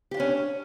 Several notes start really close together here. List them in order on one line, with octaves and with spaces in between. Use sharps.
G4 F4 D4 C#4